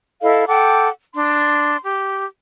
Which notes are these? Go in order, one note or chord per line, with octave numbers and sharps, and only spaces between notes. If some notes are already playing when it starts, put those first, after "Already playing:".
E4 A4 D#5 F5
A4 F#5 G5 D6
D4 C6
G4